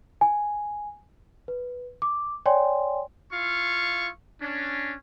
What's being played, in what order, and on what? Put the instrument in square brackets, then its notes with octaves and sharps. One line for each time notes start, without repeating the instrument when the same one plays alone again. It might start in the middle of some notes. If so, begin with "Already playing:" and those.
[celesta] G#5
B4
D6
C#5 D5 G5 G#5 C6
[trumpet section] E4 F4 F5 C#6
C#4 D4